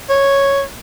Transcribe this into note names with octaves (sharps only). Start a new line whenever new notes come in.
C#5